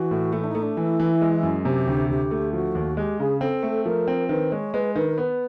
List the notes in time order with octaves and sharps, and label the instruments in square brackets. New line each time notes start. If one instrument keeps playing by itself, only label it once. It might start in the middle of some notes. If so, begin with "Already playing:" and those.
Already playing: [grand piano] E3 [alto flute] F#4
[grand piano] A2
[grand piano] A3 [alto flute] E4
[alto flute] D4
D#4
[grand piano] A3
[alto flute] D4
[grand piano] E3 [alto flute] E4
[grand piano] E3
G#3
F#2
[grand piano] C3 [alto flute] G4
[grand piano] D2
[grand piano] D2 [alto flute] G4
[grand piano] A3
[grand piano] F3 [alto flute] F#4
[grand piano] D#2
[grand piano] G#3 [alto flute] G4
[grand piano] C#3 [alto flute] G#4
[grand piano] C4 [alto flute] A4
[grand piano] A3
[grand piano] F3 [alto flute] A#4
[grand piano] C4
[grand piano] D#3 [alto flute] B4
[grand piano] G#3 [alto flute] C#5
[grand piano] G#3 [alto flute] B4
[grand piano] D#3 [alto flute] B4
[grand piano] B3